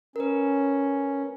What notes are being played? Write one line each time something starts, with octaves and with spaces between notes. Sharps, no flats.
C#4 A#4 B4